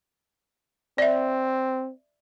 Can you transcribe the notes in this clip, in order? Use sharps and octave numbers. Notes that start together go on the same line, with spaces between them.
C4 D5 E5